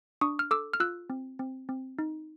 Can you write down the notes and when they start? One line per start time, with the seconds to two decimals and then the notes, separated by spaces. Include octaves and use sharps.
0.21 D4 C#6 D#6
0.39 F6
0.51 A4 D6 E6
0.74 F6
0.80 F4 E6 F#6
1.10 C4
1.39 C4
1.69 C4
1.99 D#4